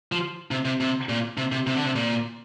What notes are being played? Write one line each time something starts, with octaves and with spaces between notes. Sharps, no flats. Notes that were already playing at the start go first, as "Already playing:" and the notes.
F3
C3
C3
C3
A#2
C3
C3
C3
D3
C3
A#2